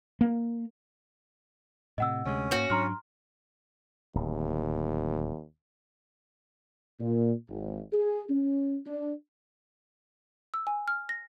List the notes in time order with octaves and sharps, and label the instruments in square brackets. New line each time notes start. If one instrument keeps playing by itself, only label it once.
[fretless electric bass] A#3
[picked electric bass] A2 C3 [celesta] D#5 F#5 E6
[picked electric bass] D2 C3 G#3 [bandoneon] C#4
[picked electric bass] G#2 A#3 [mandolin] F#4 C#5
[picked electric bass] G#2 F#3 D4 [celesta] A#5 C6 F6
[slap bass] D1 [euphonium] D#2
[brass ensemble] A#2
G#1
G#4
C#4
D4
[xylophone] E6
G#5
F6
A#6